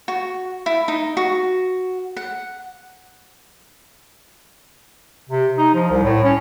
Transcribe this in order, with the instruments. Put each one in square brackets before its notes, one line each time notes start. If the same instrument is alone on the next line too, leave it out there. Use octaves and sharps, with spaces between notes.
[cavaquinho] F#4
E4
D#4
F#4
F#5
[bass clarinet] C3
D#4
F3
C2
A2
C#4